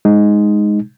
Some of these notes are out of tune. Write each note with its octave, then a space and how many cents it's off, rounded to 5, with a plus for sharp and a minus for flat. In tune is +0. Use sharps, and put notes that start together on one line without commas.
G#3 +0 D#4 +0